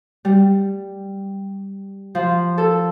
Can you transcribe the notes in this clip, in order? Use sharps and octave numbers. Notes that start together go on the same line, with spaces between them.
G3
F3
A4